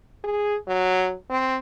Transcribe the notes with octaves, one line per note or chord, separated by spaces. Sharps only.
G#4
F#3
C4